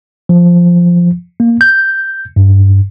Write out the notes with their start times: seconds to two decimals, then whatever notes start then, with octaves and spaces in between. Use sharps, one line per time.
0.29 F3
1.40 A#3
1.61 G6
2.36 G2